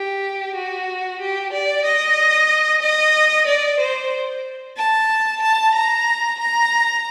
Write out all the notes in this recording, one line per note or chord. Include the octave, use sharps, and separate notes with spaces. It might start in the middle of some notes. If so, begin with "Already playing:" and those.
Already playing: G4
F#4
G4
D5
D#5
D#5
D5
C5
A5
A5
A#5
A#5